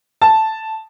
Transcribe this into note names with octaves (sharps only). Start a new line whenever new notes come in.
A5